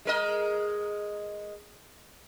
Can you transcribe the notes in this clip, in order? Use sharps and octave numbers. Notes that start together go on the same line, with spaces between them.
G#3 A#4 D#5